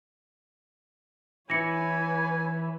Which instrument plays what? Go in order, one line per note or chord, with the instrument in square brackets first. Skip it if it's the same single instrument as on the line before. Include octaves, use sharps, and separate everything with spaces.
[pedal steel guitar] E3 E4 [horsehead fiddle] B4 C#5 [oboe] G#5 [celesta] A#6 C#7